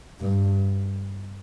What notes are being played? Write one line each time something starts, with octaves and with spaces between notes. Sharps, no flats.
G2